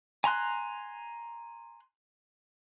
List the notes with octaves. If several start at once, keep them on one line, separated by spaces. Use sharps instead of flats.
G#5 A#5 C6 F#6